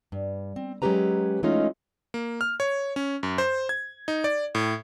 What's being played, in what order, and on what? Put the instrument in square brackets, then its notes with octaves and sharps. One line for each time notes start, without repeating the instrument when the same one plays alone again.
[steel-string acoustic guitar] G2
C4
F#3 G#3 C#4 G4 B4 A#5
E3 G#3 A3 C#4 D#4 F4
[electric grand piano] A#3
F6
C#5
C#4
F#2
C5
G#6
D#4
D5
A2